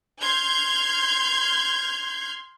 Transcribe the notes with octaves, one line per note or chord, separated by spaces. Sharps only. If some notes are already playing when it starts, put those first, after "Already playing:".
C6 F6 G6 G#6